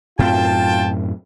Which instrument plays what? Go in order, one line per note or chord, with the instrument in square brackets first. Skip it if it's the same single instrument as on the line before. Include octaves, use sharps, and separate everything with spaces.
[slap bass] F#2 A2 C4 [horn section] F4 G5 A5